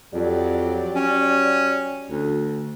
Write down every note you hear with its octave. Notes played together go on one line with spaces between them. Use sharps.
F2 F#3 G4 D5
C#4
D2